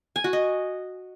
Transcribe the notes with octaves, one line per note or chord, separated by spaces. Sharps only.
G#5
F#4
D#5